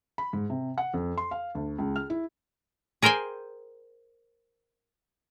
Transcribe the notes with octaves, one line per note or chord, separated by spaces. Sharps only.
B5
G#2
C3
F#5
F2
C6
F5
D2
C#2
F6
E4
G#4 A#4 C5 G5 G#5